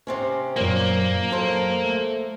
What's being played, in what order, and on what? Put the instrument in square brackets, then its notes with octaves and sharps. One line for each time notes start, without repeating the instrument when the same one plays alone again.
[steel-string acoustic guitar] C3 C4 C#4
[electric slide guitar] F#2 C5 C#5 [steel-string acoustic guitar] A#2 [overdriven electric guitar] A#3
[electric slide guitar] F#3 [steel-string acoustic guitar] A4 C5
[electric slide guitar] A3